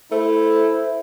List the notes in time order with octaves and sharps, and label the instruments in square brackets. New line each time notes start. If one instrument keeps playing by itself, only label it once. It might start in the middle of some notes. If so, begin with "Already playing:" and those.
[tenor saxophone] A3 [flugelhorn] E4 [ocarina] C5